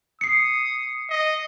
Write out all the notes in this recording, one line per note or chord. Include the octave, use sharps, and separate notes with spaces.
D#6 C7 C#7
D#5